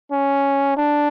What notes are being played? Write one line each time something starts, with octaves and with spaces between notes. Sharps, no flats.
C#4
D4